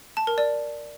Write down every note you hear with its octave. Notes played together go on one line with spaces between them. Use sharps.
A5
A#4
D5